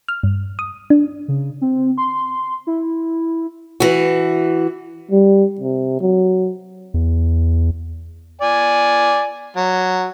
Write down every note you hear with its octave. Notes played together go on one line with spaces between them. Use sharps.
F6
G2
D#6
D4
C#3
C4
C6
E4
E3 F#4
G3
C3
F#3
E2
D5 G#5
F#3